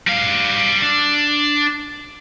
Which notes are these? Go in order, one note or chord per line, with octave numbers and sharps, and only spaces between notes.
G3 F5
D4